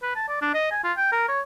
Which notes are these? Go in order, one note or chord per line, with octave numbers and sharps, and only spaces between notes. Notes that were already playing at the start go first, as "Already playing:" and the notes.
B4
A5
D5
D4
D#5
G#5
F4
G5
A#4
C#5